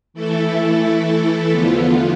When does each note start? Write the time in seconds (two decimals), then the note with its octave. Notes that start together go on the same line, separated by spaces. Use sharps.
0.14 E3 A3 E4 A4
1.51 E2 D3 F3 B3 F4